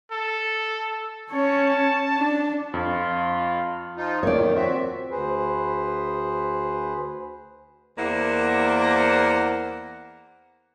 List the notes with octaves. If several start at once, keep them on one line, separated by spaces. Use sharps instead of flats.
A4
C#4 C#5 A5
D4
F2 F4
F3 D#4 F4
F2 A#2 D#3 C#5 D5
C4 F#4 E5
D2 G#4 B4 C5
E2 A#3 E4 C5 D5 F#5